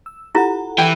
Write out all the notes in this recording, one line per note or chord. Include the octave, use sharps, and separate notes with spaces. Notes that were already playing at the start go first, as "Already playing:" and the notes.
E6
E4 F4 G4 A4 F#5 A#5
E3 G5